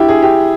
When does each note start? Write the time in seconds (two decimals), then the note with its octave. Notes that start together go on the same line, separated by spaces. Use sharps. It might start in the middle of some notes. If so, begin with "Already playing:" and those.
Already playing: E4 G4
0.09 G#4
0.22 G4